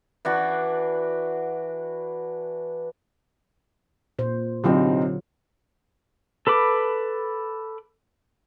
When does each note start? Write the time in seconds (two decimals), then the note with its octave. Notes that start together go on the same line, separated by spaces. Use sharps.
0.25 E3 D4 F#4
4.19 A#2 C5
4.64 C2 D3 F#3 C4 D#4 F4
6.47 A4 B4 B5 D6